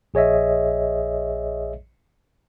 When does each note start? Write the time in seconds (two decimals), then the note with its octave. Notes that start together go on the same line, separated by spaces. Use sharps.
0.14 A#1 G#4 C#5 D#5 E5